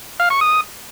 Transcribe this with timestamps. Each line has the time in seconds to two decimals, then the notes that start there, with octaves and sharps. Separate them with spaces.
0.20 F5
0.30 C#6
0.41 D#6